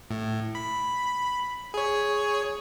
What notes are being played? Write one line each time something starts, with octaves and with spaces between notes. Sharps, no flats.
A2
B5
G#4 C#5